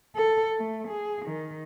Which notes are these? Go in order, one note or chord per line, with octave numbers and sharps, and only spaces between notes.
A4
A3
G#4
D#3